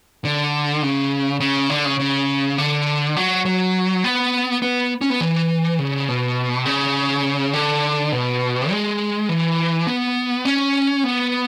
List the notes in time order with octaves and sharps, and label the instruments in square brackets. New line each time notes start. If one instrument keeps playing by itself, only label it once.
[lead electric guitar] D3
C#3
C#3
D3
C#3
C#3
D3
F#3
F#3
B3
B3
C#4
B3
E3
C#3
B2
C#3
D3
B2
G#3
E3
B3
C#4
B3